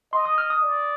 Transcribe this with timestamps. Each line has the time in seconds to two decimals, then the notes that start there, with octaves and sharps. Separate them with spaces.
0.13 D#5 C6
0.26 D#6
0.38 F6
0.50 D#6
0.63 D5